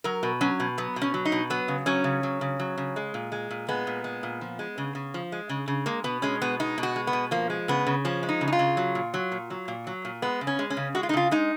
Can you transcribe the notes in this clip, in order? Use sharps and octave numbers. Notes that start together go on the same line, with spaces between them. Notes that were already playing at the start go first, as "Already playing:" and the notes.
F#3 A#4
B2
F#3 C#4
B2
F#3 B3
B2
C#4
F#3
D#4
B2
F#3 B3
C#3
F#3 C#4
C#3
F#3
C#3
F#3
C#3
G#3
A#2
G#3
A#2
G#3 B3
A#2
G#3
A#2
F3
G#3
C#3
C#3
F3
G#3
C#3
C#3
G#3 A#3
B2 B3
G#3 C#4
B2 B3
G#3 D#4
B2
F#4
G#3
B3
B2
F3 A#3
G#3
C#3 B3
C#3
F3 C#4
G#3
D#4
C#3
D#4
F4
C#3
F#3
A#2
F#3
A#2
F#3
A#2
F#3
A#2
G#3 B3
C#3
C#4
G#3
C#4
C#3
G#3 F#4
F4
D#4
C#3 F4
G#3 D#4